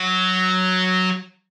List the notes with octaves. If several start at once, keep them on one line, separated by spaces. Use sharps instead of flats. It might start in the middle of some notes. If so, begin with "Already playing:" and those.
Already playing: F#3